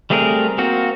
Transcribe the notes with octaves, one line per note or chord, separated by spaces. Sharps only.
G3 A3 C4 G#4 A#4
A#3 C4 F#4